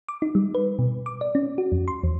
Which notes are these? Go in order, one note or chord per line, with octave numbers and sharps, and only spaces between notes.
D6
D#4
G3
B4
B2
D6
D5
C#4
F#4
F2
C6
E2